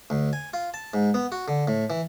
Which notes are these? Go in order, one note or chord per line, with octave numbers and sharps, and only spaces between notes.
D2
G#5
F4
A5
G#2
B3
F#4
D3
A2
E3